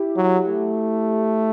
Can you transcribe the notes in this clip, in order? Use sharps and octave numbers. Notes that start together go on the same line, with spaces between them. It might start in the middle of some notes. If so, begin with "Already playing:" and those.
Already playing: E4 G4
F#3
A3